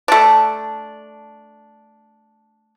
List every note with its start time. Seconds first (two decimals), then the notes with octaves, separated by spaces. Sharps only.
0.08 A3 D4